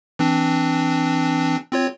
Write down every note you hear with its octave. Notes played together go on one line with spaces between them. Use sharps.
E3 C4 D4
C4 F4 C#5